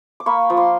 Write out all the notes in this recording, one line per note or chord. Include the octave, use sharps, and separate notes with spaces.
D6
A#3 B5 C#6
F3
C6 D6